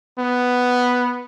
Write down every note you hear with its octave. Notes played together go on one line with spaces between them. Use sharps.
B3